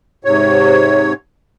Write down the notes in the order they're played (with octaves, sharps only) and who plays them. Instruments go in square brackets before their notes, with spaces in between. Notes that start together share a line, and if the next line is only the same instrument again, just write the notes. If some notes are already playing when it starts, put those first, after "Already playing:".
[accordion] G#2 C3 C#5